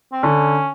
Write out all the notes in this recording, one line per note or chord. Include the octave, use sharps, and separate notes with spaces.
C4
D3 C#4